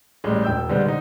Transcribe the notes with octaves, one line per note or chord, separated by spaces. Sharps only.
A1 G3 G#3
E1 G5 E6 G6
D3 G3 G#3 B3 C5
D3 D#4